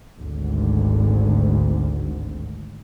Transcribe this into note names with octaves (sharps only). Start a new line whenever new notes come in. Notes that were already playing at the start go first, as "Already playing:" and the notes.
G#1 D2